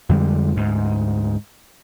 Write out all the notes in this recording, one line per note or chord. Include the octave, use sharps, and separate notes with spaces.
F2 D3 G3 G#3
D2 G#2